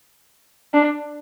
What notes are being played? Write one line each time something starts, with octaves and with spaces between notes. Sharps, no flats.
D4